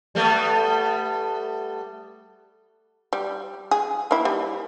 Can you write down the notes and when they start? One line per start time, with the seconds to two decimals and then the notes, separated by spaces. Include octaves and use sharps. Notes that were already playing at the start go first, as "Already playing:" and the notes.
0.15 G3 A3 B3
3.13 G3
3.71 G#4
4.11 A#3 E4
4.25 G3